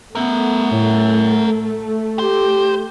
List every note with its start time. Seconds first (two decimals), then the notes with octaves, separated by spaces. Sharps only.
0.15 A3 B3 A#4 E5
0.71 A2
2.19 G4 C5